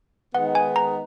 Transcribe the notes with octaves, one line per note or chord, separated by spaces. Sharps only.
D#3 G#3 B3 D#4 F#5
G#5
A#5